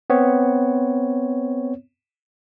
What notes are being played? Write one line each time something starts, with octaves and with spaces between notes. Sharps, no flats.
B3 C4 C#5